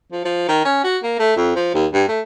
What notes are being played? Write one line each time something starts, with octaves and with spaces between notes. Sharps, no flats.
F3
F3
D#3
C#4
F#4
A#3
A3
F2
F3
D#2
G2
A3